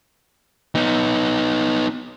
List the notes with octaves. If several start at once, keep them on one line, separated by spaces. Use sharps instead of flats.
B3 D#4